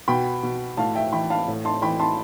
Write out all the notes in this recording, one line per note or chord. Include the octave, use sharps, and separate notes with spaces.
B2 G5 B5
B2
A2 F5 A5
E5 G5
E3 G5 B5
F5 A5
A2
A5 C6
E3 G5 B5
A5 C6